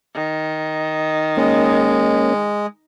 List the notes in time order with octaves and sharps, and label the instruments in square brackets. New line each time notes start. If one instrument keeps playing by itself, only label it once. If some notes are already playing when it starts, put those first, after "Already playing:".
[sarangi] D#3
[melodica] G#3 [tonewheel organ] A#3 C#4